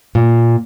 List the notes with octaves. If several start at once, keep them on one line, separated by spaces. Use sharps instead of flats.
A#2